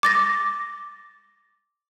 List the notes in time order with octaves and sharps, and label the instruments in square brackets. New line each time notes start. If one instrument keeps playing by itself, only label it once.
[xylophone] D6 A6 A#6